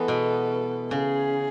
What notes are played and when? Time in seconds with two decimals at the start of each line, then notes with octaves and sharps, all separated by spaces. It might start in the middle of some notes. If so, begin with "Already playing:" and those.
Already playing: E3 G#3 B3 A4
0.08 B2
0.91 C#3 G#4